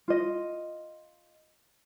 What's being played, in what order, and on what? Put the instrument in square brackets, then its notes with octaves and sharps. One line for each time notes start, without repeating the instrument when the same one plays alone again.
[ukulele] F4 D#5